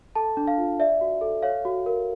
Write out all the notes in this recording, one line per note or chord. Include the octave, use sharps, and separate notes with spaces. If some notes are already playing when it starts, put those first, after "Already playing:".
A4 A5
D4
F5
F4
D5 E5
F#4
A4
C#5 F5
F#4
A#4